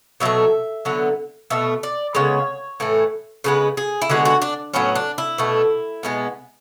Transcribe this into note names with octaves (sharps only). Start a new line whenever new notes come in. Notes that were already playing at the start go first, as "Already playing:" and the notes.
B2 F#3 A3 E5
D3 F#3 B3
B2 A3 E5
D5
C#3 G#3 B3 C#5
A2 E3 A3
C#3 G#3 B3 B4
G#4
E4
D3 G#3 B3 F#4
F#4
D4
A2 F#3 B3 C#4
D4
E4
B2 A3
B2 G#3 B3